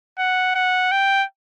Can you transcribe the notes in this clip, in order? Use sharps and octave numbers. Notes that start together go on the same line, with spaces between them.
F#5
F#5
G5